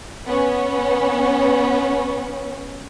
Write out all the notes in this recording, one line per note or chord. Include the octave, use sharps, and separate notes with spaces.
B3 C#4